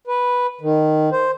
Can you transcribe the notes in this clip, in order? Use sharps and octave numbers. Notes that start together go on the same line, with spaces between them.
B4
D#3
C5